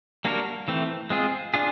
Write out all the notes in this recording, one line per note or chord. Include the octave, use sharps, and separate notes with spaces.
G3 A#3 D4 F#4 A#4
E3 A3 C4
G#3 C4 F4 G#4
D4 F4 G#4